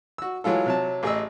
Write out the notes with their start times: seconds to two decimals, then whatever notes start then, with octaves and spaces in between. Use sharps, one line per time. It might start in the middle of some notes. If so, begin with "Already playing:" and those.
0.18 F#4 E6
0.44 E3 F#3 G#3 F4 A4
0.66 C3 F#3 A5
1.03 A1 G#4 D#5 E6